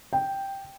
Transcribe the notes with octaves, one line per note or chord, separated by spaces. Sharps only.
G5